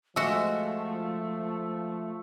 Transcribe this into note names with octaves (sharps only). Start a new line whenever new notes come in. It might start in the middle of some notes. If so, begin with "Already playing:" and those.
F3 G#3 A3 F#4 E5